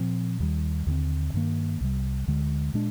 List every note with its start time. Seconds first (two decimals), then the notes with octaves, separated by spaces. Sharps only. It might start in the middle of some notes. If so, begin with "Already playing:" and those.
Already playing: A#2 F3 C4
0.40 D#2 D#3 G3
0.86 D#2 D3 G3 C4
1.34 G2 D#3 A#3
1.81 C2 C3 G3
2.27 D2 D3 G#3
2.74 A#2 G#3 D4